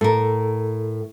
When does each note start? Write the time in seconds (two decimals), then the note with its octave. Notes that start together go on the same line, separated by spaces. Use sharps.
0.01 A2 A4 A#4